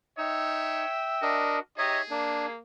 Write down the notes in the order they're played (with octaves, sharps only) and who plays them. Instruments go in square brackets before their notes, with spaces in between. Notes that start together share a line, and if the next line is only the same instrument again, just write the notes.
[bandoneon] D#4 [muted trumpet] C#5 [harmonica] E5 G5
[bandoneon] D4 A#4 D#5 [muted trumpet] F#4
[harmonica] D#4 G4 D#5 [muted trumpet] G#4 [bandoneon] C#5 E5
[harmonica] A#3 [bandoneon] D4